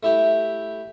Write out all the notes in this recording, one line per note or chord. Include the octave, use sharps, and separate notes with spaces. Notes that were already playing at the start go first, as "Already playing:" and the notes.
A3 E4 G4